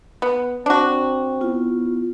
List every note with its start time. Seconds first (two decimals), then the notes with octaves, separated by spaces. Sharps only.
0.22 B3
0.66 C4 D4 F#4
1.41 B3 E4 F4